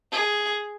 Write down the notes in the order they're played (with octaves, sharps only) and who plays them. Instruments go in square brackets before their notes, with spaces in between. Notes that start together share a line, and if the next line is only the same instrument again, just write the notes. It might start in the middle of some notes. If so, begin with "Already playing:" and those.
[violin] G#4